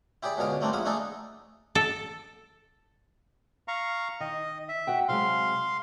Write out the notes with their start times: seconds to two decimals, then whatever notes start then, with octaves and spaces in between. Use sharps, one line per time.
0.23 E4 G4 G#4 D5 B5
0.37 C#2 B2 D3 G#4 F5
0.61 G3 A3 A#3 C4 D4
0.73 A#1 E4 F5 F#5 D#6
0.85 A3 D4 D#4 G#4 A4
1.75 A4
3.68 F5 A#5 C#6
4.20 D#3 D#5
4.69 E5
4.87 F#4 F#5 G5
5.08 C3 F#3 G#3 F5 C6